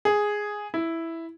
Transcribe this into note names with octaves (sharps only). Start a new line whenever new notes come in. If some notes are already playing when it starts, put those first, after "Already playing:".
G#4
E4